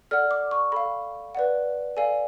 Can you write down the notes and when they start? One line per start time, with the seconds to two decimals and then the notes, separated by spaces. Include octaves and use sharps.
0.11 A4 D5 F#5 F6
0.31 D6
0.51 C#6
0.72 A4 F5 B5
1.35 B4 D5 F#5
1.97 A4 D5 F5 G#5